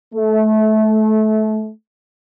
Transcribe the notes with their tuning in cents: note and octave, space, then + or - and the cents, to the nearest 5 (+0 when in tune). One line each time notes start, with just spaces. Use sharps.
A3 -25